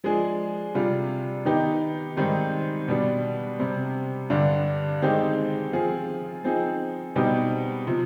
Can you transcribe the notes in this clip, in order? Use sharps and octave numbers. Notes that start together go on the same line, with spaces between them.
F3 G#3 D4 G#4
C3 G3 D4 F4
D#3 B3 D#4 G4
G#2 D#3 G3 C4 D#4
B2 G3 D4
C3 G3 C4
G2 D3 G3 D4
D#3 G#3 C4 D#4 G4
F3 C4 F4 G#4
F3 C4 D#4 G#4
B2 G3 C4 D#4 G4
C3 F3